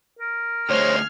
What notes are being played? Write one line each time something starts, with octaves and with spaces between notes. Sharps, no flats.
A#4
D2 G#3 C5 C#5 F6 G#6 C7